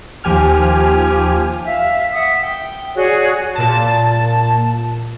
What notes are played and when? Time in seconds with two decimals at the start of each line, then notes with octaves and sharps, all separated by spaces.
0.24 D#2 F3 G4 G#5 F6
1.66 E5 F5
2.12 E5 F#5 D#6
2.41 G5
2.95 F#4 G#4 C#5 D5
3.55 A#2 A5